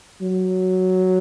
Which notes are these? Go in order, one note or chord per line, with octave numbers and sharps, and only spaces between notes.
F#3